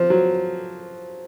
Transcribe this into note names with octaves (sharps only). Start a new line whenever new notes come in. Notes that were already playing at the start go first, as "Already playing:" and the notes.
Already playing: F3
F#3